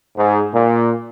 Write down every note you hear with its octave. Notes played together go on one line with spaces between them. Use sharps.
G#2
A#2